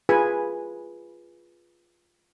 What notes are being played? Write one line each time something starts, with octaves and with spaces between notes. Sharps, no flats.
F4 G#4 B4 G#5 B5